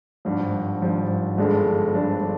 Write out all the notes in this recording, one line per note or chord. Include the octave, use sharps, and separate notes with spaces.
G#1 G2 F3
G#1 G2 F3
G1 G2 F3 G#3 D4
G1 G2 F3 G#3 D4